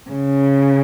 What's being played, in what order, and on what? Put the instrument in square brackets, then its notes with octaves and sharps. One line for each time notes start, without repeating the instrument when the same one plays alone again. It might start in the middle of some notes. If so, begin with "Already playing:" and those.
[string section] C#3